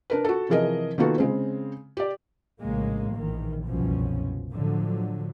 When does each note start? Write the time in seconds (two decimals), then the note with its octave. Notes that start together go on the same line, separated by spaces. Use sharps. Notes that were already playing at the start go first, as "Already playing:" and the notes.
0.10 D4 A#4 B4
0.25 F#4 A4
0.49 C3 E3 F3 G#4 A#4 D#5
0.98 D#3 A#3 B3 F4 F#4 A4
1.18 C#3 G#3 C4
1.97 G4 D5
2.60 A#1 A2 C#3 G#3 A#3
3.15 A#1 D#3 E3
3.66 F#1 C2 F#2 B2 F3 C#4
4.52 A2 D3 F3 F#3